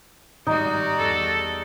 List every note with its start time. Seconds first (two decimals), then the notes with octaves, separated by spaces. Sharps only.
0.47 G#1 G2 G3 D#4 F#4
0.99 E2 A4